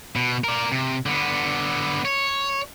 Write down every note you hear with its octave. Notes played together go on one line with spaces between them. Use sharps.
B2
A#4 D5
C3
D3 B3
C#5